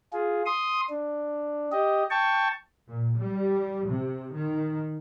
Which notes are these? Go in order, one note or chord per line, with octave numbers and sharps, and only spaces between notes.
F4 G#4
C6 D#6
D4
G4 D#5
G5 A5 C#6
A#2
G3
C3
D#3